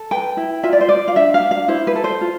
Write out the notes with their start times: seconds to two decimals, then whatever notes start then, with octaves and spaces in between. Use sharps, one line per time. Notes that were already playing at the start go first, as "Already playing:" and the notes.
Already playing: A4
0.11 B4 G5
0.37 E4
0.63 F4 E5
0.73 D5
0.81 C5
0.89 F4 D5
1.08 F5
1.16 D4 E5
1.34 F5
1.42 D4
1.51 F5
1.68 E4 C5
1.87 B4
1.96 A4
2.04 C5
2.21 F4